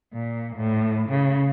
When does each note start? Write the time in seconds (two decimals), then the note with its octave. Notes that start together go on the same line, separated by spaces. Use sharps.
0.12 A#2
0.55 A2
1.07 C#3